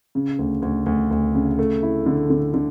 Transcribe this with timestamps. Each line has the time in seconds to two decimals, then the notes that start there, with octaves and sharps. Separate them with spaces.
0.15 C#3
0.39 D2
0.62 D2
0.86 D2
1.11 D2
1.35 C#3
1.59 A3
1.83 E4
2.06 D3
2.30 D3
2.54 D3